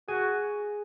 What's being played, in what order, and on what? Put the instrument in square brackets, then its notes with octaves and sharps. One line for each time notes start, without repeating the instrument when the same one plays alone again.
[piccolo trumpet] F#4 [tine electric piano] G#4 G#5